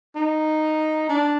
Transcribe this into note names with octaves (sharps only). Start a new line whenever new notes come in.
D#4
D4